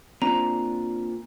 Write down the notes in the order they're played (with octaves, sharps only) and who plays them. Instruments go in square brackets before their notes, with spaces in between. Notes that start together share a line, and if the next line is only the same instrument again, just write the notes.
[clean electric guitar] A#2 [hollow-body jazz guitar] C4 D4 C5 [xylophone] A#5